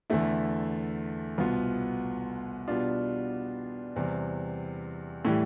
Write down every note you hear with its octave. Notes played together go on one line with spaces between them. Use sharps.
E2 D3 A3 E4
C2 B2 B3 F4
B2 G3 B3 D4 F4
E2 C3 G3
A2 E3 G3